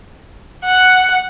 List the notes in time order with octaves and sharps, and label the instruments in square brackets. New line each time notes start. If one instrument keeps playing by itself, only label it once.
[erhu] F#5